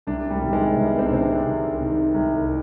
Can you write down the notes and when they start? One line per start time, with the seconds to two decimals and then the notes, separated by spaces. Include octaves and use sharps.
0.07 C2 D4
0.30 G3
0.42 C3 D#3
0.49 G3
0.53 G#3
0.76 C2 B3
0.99 C4
1.06 D4
1.10 C3 D#3 C4
1.22 D4
1.45 C2
1.80 C3 D#3
2.14 C2